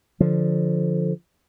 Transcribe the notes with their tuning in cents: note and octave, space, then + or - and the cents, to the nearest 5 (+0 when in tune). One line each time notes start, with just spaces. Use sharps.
D3 +0 F3 +0